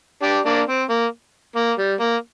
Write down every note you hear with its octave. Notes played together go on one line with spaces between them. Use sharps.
D4 G4
A#3 D4
C4
A#3
A#3
G3
A#3